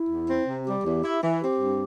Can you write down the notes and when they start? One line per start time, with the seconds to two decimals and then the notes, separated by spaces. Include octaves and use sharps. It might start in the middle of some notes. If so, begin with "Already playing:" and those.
Already playing: E4
0.09 E2
0.28 C4
0.47 C3
0.65 G3 G4
0.85 E2
1.03 E4
1.23 E3
1.42 C4 G4
1.60 G2